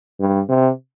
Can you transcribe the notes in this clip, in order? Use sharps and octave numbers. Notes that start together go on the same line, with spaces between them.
G2
C3